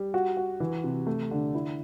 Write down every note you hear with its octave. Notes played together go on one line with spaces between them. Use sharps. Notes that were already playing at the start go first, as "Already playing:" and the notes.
Already playing: G3
F#4
F#4
E3
C3
A3
D3
E4